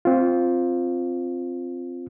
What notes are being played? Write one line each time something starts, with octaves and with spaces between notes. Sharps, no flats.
C4 F4